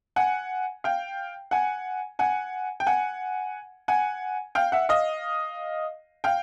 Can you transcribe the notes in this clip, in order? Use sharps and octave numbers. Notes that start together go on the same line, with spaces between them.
F#5 G#5
F5 G5
F#5 G#5
F#5 G#5
G5
F#5 G#5
F#5 G#5
F5 G5
E5 F#5
D#5 F5
F5 G5